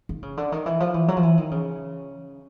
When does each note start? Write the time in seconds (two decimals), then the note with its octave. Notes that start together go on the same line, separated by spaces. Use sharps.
0.09 D#3
0.23 C#3
0.37 D3
0.52 D#3
0.66 E3
0.80 F3
0.94 E3
1.08 F#3
1.17 F3
1.23 E3
1.38 D#3
1.51 C#3